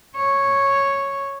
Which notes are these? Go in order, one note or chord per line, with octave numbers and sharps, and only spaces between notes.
C#5